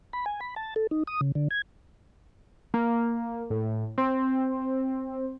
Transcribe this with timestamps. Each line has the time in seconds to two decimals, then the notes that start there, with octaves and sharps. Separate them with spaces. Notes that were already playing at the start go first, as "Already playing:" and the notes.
0.13 B5
0.26 G#5
0.41 B5
0.56 A5
0.76 A4
0.91 D#4
1.07 D#6
1.21 C#3
1.35 D3
1.51 G#6
2.74 A#3
3.50 A2
3.98 C4